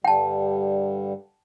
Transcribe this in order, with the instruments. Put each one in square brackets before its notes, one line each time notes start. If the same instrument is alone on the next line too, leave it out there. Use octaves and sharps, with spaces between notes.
[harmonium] G2 D3 G3 [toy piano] G5 A5